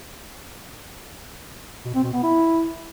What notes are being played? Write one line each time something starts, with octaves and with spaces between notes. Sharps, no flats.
B2
C4
B2
B3
E4